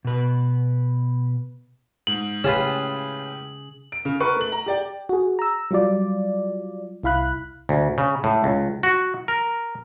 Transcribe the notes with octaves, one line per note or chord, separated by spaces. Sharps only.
B2 B4
G#2 F#7
A2 C#3 C#4 F4 G4 G#4 B4 E7
D7
C#3
A#4 B4 C#6
A3 F#7
A#5
G4 D5 G5
F#4 G#4
A#5 E6
F#3 G3 F4 D5
C2 E4 F5 B5 F#6
D2
C#3
A2
C#2
F#4
A#4